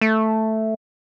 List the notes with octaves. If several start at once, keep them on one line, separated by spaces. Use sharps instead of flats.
A3